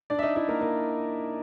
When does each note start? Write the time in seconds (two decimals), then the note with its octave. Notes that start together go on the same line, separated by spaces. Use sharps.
0.10 D4 D5
0.19 E5
0.22 D#4 D#5
0.35 E4 E5
0.48 A#3 A#4
0.61 A#3 A#4